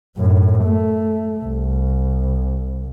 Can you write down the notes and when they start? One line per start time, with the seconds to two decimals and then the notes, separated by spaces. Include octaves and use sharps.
0.17 F#2 A2
0.64 A3
1.45 C2